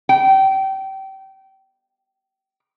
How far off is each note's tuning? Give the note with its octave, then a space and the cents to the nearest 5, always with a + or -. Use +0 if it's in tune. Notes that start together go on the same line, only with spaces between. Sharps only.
G5 -25